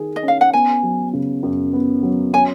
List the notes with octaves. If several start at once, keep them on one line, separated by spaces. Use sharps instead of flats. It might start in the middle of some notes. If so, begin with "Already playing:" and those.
Already playing: D#3 G#4
D#5
C#4
F5
F#5
B3 G#5
F#3
C#3
F#2
B3
F#3
C#4 G#5